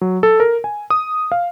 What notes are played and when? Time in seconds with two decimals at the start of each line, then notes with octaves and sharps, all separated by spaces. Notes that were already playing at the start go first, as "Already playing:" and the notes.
0.01 F#3
0.23 A4
0.40 A#4
0.64 G#5
0.90 D#6
1.32 F5